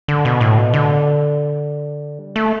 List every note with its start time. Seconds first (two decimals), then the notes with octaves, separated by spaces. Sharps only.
0.08 D3
0.25 B2
0.41 A2
0.58 B2
0.74 D3
2.19 G3
2.36 A3